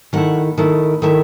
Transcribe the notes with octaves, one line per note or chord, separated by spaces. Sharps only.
D#3 A3 E4 F#5
D#3 A3 E4
D#3 A3 E4